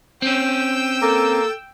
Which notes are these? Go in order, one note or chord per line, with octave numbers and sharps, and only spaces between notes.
C4 C#4 G5 E6
A#3 A4